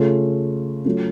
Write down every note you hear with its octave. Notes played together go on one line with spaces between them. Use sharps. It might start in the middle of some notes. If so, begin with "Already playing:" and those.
Already playing: C#3 A3 C#4 F4
F#3 A3 C#4 F4